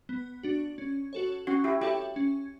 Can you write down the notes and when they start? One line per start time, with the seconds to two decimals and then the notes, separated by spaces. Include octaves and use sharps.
0.09 B3
0.43 D4 F#4
0.78 C#4
1.13 F#4 A4 C#5
1.47 C#4 F#4
1.64 E4 G4
1.81 E4 F#4 G4 A4 C#5
2.16 C#4